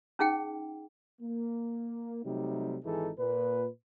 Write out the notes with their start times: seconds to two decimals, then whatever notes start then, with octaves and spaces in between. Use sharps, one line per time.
0.19 C#4 D#4 G#4 F#5 G5
1.22 A#3
2.25 C3 F#3 G3 A3 D#4
2.85 G#1 E3 D#4 G#4 A4
3.19 A#2 B4